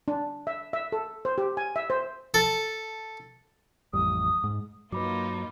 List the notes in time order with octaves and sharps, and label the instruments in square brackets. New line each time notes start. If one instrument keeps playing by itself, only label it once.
[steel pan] D4
E5
E5
A4
C5
G4
G#5
E5
C5
[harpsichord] A4
[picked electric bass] A1 F2 G3 [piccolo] D#6
[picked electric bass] G#2
[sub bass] G2 [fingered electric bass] F#3 [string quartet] A#3 D#4 F4 [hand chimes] B4 B5 D6